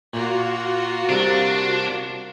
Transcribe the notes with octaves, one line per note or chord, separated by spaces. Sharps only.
A#2 A#3 F4 F#4
C2 C3 D4